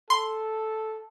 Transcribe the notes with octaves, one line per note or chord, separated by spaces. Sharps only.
A4 C6